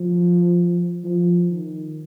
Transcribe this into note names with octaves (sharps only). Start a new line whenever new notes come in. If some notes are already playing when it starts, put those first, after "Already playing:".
Already playing: F3
F3
D#3